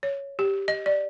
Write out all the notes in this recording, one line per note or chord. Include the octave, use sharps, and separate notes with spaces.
C#5
G4
D#5
D5